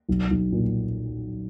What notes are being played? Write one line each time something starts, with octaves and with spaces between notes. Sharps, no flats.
B1
B1
A#2